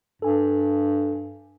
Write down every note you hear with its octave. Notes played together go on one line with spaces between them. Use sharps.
G2 A4 G#5